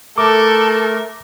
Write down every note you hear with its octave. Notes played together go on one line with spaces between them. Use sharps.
A3 A4 A#4 D6